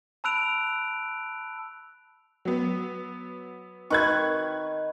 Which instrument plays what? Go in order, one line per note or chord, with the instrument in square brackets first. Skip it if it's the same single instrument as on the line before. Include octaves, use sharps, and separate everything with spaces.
[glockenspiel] A5 B5 E6 F#6 D7 F7
[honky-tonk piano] F#3 B3
[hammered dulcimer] D#3 B4 [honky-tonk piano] C#6 F#6 G#6